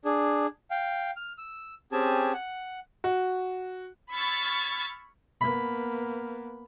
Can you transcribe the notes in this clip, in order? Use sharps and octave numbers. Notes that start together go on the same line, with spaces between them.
D4 G#4
F5 G5
F6
E6
C4 C#4 G4 G#4 G#5 A5
F#5
F#4
B5 C#6 E6 F6 G#6 A6
A#3 B3 B5